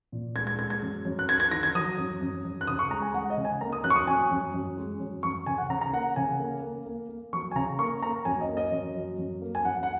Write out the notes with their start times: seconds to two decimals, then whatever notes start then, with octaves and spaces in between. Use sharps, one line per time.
0.12 A#2
0.35 G#3 G#6
0.47 G#6
0.59 G#3 G#6
0.70 G#6
0.82 F#2
1.05 F#2
1.19 F#6
1.28 F#2 G#6
1.40 G#6
1.51 D#3 A#6
1.63 G#6
1.75 F#3 D#6
1.98 F#2
2.21 F#2
2.44 F#2
2.61 F#6
2.67 C#3 D#6
2.79 C#6
2.91 G#3 A#5
3.02 G#5
3.14 G#3 F#5
3.30 D#5
3.37 C#3
3.45 G#5
3.61 A#3 A#5
3.72 D#6
3.84 F#2 F#6
3.90 C#6
3.96 D#6
4.07 F#2 G#5
4.31 F#2
4.54 F#2
4.77 G#3
5.00 F#2
5.23 F#2 C#6
5.46 C#3 G#5
5.58 F#5
5.70 C#3 A#5
5.81 A#5
5.93 A#3 F#5
6.16 C#3 G#5
6.39 A#3
6.62 A#3
6.86 A#3
7.09 A#3
7.33 F#3 C#6
7.51 G#5
7.55 C#3 A#5
7.79 A#3 C#6
8.02 A#3 A#5
8.25 F#2 G#5
8.41 D#5
8.48 A#3
8.57 D#5
8.72 F#2
8.95 F#3
9.19 F#2
9.41 A#3
9.55 G#5
9.65 F#2 F#5
9.83 F#5